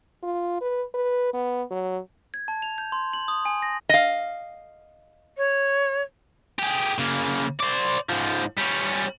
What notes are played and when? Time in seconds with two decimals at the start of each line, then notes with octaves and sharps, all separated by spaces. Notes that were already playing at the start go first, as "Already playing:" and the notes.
0.23 F4
0.61 B4
0.94 B4
1.34 B3
1.71 F#3
2.34 G#6
2.48 A5
2.62 F7
2.78 G6
2.92 C6
3.13 F#7
3.28 D#6
3.45 G#5
3.62 A#6
3.89 D#5 F5
5.37 C#5
6.59 G4 G#4
6.98 C#3 A#3
7.60 C5 D5
8.10 G#2 F3
8.57 G3 C#4